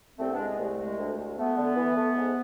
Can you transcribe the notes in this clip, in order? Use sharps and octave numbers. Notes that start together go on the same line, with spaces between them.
C2 A3 C4
B3 D4
G#3
B3
C2 A3
G#3
D2
D2
A3 B3
D3
E3
A3
G#2